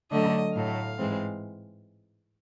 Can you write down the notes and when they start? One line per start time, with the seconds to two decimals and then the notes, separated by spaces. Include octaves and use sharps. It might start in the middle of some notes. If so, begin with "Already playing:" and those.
0.11 D3 F#3 A3 D4 D#5
0.56 A2 F#3 A3 F5
0.99 G#2 E3 G#3 C4